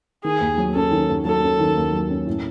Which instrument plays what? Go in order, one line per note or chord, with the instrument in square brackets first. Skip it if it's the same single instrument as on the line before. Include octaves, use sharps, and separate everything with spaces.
[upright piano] D#3 [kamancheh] G#4
[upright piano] D#2
F#3
[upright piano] C#4 [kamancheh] A4
[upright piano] D#3
D#2
[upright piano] F#3 [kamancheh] A4
[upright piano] C#4
D#3
D#2
F#3
C#4
A2